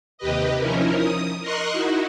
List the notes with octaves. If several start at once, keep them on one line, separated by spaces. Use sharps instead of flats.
D#2 C3 G4 B4 D#5
F3 C#4 D#4 E4 A#4
D#6
A#4 D#5 C6 C#6 F#6
D#4 E4 F#4